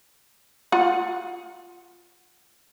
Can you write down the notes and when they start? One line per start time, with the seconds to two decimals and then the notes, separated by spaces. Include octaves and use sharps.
0.72 F4 F#5